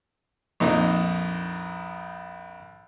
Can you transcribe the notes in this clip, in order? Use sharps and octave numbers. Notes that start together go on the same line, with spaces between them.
A#1 F2 D#4